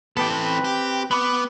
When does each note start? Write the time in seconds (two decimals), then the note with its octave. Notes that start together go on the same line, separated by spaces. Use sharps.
0.17 E3 B3 G4 A4
0.31 C4 B4
0.64 G4
1.11 B3 B5 D6